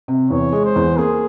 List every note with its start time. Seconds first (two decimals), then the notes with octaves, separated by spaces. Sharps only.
0.08 C3
0.31 E2 C#5
0.52 G#3
0.65 C5
0.76 E2
0.98 A#3 G#4